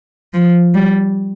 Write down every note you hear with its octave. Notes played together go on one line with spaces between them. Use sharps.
F3
G3